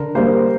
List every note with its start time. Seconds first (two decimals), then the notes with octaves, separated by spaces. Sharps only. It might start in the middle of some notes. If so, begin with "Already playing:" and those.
Already playing: D3 A#4
0.15 G3 A#3 C5